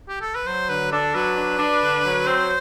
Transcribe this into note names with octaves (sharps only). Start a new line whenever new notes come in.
G4
A4
B4
F#3 C5
D3 B4
D4 A4
F#3 B4
D4
D4
D3
F#3
C4 C5